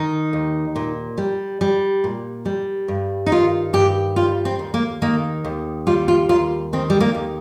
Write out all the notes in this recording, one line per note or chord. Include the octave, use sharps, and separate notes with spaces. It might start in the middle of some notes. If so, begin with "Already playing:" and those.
Already playing: D#3 D#4
D#2
A#2
G3
G3
A#2
G3
G2
D#4
D#3 F4
G2 G4
G3 F4
C4
D#2
A#3
D#3 A#3
D#2
G3 F4
F4
D#2 F4
D#3 C4
G3
A#3
D#2